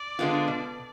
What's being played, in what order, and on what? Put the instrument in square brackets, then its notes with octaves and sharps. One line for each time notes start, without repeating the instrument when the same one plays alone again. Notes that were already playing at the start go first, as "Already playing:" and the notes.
Already playing: [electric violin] D5
[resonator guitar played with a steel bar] D3 G#3 B3 F4
B2